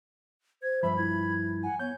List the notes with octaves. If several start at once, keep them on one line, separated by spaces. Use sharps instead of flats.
C5 G#6
G2 F3 E5 B5
E4 G#6
F#5 G#5
B3 C#5 G6